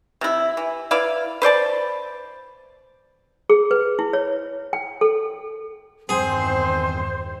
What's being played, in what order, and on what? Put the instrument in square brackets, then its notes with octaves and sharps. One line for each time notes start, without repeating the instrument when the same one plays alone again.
[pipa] C3 E4
E3
E4 B4 D5 F5
B4 C5 D5 A5
[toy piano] G#4
B4
E4
C#5
G5
A4
[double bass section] E2 G2 D#3 [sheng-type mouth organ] C4 [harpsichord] G#4 [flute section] C5